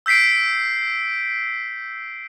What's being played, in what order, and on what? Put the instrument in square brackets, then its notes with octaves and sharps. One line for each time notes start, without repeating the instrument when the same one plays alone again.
[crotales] E6 G6 B6 C7 D7